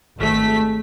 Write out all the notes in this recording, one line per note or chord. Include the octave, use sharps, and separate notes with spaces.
G#1 A3 B6